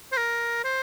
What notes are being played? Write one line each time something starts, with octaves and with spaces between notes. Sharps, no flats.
C5
A#4
C5